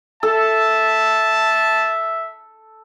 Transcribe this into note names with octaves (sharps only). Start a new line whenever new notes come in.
A4 E5 A5